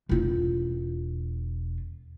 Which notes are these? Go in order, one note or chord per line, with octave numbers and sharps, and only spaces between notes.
E1 F4